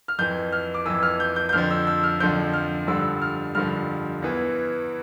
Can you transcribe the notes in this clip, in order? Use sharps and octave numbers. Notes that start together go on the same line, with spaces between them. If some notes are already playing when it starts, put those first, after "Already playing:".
F6
F2 E3 G6
F6
D6
F2 E3 E6
F6
G6
G6
G6
F2 D3 F3 F6
E6
E6
F6
F2 D3 F3 G6
F6
G2 D3 F3 E6
F6
G2 D3 F3 F6
E2 E3